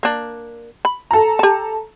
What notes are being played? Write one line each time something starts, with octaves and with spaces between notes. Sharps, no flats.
A#3 D4
B5
A4 A#5
G4 A5